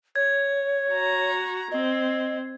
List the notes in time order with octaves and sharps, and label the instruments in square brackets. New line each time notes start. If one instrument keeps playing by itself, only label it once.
[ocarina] C#5 [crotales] G#6
[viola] F#4 A#5
[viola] C4 [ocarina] D#5